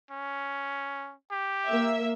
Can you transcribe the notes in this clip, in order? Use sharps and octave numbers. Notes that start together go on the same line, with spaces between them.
C#4
G4
A#3 E5